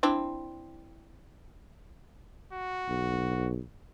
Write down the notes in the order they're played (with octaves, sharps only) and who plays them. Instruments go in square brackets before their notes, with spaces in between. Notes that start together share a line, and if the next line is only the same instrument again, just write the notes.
[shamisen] C4 D4 E4
[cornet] F#4
[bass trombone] B1